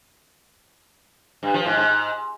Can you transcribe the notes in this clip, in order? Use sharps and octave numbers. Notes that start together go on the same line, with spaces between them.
G2
F3
G#2
G#2